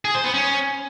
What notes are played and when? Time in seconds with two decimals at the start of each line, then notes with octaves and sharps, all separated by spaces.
0.05 G#4
0.14 C5
0.24 B3
0.34 C#4